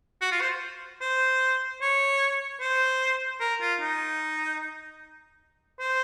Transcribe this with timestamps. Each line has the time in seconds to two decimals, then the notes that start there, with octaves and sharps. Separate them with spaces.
0.21 F#4
0.32 F4
0.41 C5
1.01 C5
1.82 C#5
2.60 C5
3.40 A#4
3.61 F4
3.81 D#4
5.80 C5